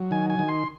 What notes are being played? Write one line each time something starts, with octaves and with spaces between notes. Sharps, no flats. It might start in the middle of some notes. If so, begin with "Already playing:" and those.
Already playing: F#3
D#3 G#5
G#5
D#3
C6